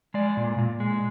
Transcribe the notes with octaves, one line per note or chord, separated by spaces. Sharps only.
G#3 D5
A#2
A#2
G#3